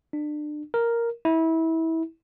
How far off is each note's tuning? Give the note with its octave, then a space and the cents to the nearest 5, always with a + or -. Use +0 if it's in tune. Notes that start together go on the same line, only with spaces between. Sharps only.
D4 +30
A#4 +0
E4 -25